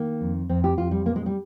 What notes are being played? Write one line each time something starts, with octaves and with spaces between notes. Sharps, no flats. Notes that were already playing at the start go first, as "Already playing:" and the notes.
Already playing: D#3 A#3
F2
F2 C4
G4
F2 F4
G3
A#2 A#3
G#3
G3